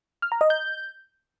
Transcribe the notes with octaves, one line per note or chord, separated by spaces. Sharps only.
F6
A#5
D#5
G6